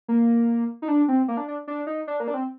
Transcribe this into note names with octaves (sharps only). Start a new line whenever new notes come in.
A#3
D#4
D4
C4
A#3
D4
D4
D4
D#4
D4
A#3
D4
C4